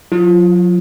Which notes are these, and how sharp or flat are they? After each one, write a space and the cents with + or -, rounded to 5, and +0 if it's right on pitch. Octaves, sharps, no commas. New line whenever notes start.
F#3 -45 F4 -15